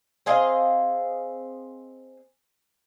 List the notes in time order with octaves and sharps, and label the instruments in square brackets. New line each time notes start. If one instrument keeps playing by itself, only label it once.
[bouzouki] C4 G#4 D#5 F5